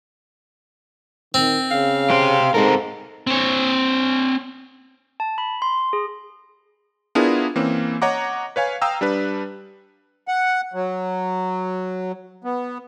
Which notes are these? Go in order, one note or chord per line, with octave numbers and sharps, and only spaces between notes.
D#3 C4
C#3 F5
G4 C5
G#2 C4 A4 A#4
C4 C#5
A5
B5
C6
G#4
B3 D4 E4 F4 G#4 A#4
E3 A#3 C4 C#4
C#5 D#5 F#5 A#5 D6
B4 C#5 F5 G#5
F5 G5 A#5 D#6 E6
G3 D4 B4
F#5
F#3
B3